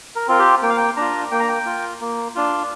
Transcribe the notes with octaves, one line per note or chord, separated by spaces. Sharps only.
A#4
C4 F4 A#4
G4
A#3 G5
F5
G5
D4 F4 A#5
A#3 G5
A#5
G5
F4
A#3
D4 F4